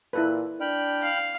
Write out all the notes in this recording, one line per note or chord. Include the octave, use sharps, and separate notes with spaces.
A#2 E4 A4 B4
D4 G5 B5 F6
F5